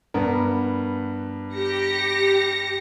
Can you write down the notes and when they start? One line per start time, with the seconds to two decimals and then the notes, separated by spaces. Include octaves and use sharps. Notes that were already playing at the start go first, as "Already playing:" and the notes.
0.14 G2 B3 A#4
1.54 G4 A#6 C#7